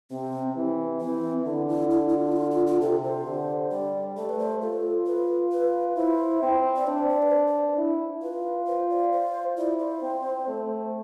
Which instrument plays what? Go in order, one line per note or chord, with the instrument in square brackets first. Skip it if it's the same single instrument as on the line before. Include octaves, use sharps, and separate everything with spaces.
[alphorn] C3 [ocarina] C4
[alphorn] E3
[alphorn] E3 [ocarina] C4
[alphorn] D3 [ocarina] E4
[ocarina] E4
E4
E4
F4
E4
F4
F4
F4
[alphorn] C3 [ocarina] A4
[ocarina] C5
[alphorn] D3
[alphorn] G3 [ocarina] D5
[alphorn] A3 [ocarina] D5
[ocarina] B4
C5
[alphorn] F4 [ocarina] A4
[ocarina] B4
B4
[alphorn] E4 [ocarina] C5
[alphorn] C4
[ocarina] D5
[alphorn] D4 [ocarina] C5
[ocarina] D5
B4
C5
D5
[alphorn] E4
[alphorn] F4 [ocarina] B4
[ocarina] C5
D5
C5
[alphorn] E4 [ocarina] D5
[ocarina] C5
[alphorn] C4
A3